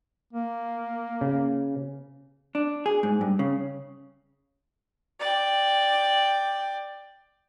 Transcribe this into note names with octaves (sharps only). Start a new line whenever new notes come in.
A#3
C#3
D4
G#4
G#2
G2
C#3
D5 G5